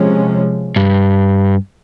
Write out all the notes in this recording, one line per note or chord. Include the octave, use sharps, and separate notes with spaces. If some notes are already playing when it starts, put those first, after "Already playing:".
Already playing: C3 F3 G#3 C#4
G2